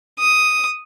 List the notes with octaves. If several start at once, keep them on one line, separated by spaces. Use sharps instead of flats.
D#6